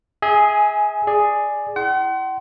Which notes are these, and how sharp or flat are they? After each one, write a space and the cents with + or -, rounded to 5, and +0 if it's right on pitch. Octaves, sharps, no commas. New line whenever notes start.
G#4 +0 E5 -40 G#5 +10
G#4 +0 D5 +10
E4 +0 F#5 +45 C6 +0